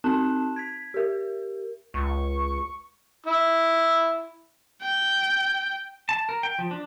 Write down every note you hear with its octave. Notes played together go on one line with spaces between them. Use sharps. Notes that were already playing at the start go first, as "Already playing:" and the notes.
C4 D#4 A5 F#6 E7
G#6 B6
G4 A#4
C#2 C#6
E4
G5
A5
A#4
G5
F3
D4